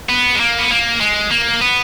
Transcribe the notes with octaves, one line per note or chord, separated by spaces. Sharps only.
B3
G#3
A#3
B3
A#3
G#3
A#3
B3